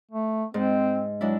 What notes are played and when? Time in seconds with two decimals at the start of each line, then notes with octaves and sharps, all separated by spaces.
0.11 A3
0.54 G#2 C4
1.21 F#3 G#3 D4 E4